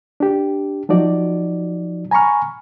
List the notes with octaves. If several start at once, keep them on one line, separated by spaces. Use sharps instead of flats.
D4 G4
F3 F#3 D#4 F#4 D5
G#5 A#5 B5 C#6 F6